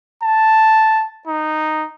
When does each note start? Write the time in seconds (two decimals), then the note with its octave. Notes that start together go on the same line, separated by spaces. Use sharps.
0.23 A5
1.27 D#4